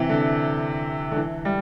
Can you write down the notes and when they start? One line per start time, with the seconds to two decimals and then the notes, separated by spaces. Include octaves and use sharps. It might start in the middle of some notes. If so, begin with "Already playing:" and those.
Already playing: C3 E3
0.09 D3
1.11 D3
1.16 E3
1.45 G3